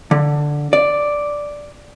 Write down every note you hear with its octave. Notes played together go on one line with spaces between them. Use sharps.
D3
D5